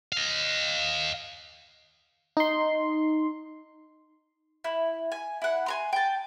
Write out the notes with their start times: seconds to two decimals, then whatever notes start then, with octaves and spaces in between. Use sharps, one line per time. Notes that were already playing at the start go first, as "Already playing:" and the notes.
0.12 D#5 F5
2.37 D#4 C6
4.64 E4
5.12 G#5
5.42 E4 F#5
5.66 G#5 A#5 C6
5.93 G5 A5